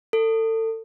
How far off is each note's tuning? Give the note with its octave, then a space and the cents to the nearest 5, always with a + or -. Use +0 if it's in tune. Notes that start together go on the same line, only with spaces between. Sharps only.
A4 +30